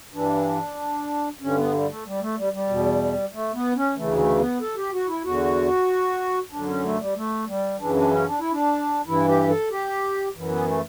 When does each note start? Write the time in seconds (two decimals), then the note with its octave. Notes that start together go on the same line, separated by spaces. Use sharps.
0.14 G2 E3 D4
1.42 G2 D3 C#4
1.57 B3
1.73 G3
1.89 A3
2.06 G3
2.21 A3
2.38 G3
2.53 G3
2.69 E2 B2
3.33 A3
3.54 B3
3.76 C#4
3.96 D2 C#3 E3 A3
4.18 A3
4.39 B3
4.61 A4
4.76 G4
4.93 F#4
5.08 E4
5.24 E2 D3 F#4
6.52 F#2 D3 D4
6.68 C#4
6.84 A3
6.99 G3
7.16 A3
7.48 G3
7.79 F#2 C#3 E3 D4
7.96 D4
8.12 C#4
8.27 D4
8.39 E4
8.52 D4
9.07 G2 E3 E4
9.28 G4
9.50 A4
9.71 G4
10.35 F#2 E3
10.50 B3
10.67 A3